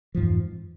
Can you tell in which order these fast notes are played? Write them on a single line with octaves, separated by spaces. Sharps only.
F3 G#2 E3 F2